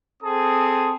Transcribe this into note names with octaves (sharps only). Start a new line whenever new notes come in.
C4 G#4 A4 A5 D#6